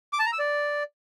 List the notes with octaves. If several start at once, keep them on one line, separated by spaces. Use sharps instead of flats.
D6
A5
A#5
E6
D5